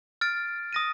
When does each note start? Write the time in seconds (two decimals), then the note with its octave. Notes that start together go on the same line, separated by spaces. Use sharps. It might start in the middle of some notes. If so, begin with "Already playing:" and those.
0.21 F6 A6 D7
0.73 D#6 A#6 D#7